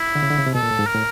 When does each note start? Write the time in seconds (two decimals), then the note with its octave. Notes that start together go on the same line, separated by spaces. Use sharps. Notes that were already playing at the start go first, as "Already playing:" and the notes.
Already playing: E4
0.15 D3
0.23 C#3
0.31 D3
0.38 C#3
0.46 C3
0.55 B2 A4
0.63 A#2
0.71 A2
0.79 G#2
0.87 A#4
0.95 A2